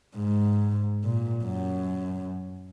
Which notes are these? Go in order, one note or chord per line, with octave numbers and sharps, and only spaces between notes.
G#2
A#2
F#2